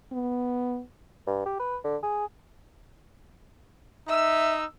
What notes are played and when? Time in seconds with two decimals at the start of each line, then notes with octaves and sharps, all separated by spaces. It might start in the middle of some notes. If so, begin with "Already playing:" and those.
0.12 B3
1.27 G2
1.46 G4
1.60 B4
1.84 D3
2.03 G#4
4.09 D#4 E5 E6